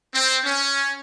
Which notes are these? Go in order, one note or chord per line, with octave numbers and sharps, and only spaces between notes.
C4
C#4